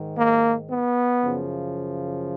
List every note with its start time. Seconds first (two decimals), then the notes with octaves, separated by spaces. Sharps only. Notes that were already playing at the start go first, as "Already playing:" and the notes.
Already playing: G#2 D#3
0.17 A#3
0.70 B3
1.23 F#2 C#3 F3